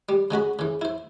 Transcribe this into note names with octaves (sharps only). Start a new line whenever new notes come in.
G3
C#3 G#3 F#4 B5
C#3 E3
E4 C5